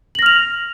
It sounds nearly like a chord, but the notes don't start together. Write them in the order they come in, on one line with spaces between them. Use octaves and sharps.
F#7 A#6 F6 F7